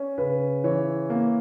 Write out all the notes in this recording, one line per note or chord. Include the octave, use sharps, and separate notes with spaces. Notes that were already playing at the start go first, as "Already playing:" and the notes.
Already playing: C#4
C#3 B4
E3 C#5
A#3